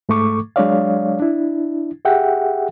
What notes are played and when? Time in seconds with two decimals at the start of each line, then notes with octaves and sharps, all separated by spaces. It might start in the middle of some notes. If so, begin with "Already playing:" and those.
0.09 G#2 A3 A4 C#6 D6
0.56 F#3 G#3 D4 C#5 D5 F5
1.20 D4 E4
2.05 G4 G#4 E5 F#5 G5